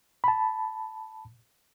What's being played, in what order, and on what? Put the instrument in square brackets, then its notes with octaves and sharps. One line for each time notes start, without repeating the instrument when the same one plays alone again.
[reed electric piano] A5 B5